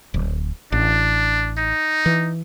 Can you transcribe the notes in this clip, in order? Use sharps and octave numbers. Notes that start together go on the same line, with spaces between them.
D1
A1 D4
D#4
E3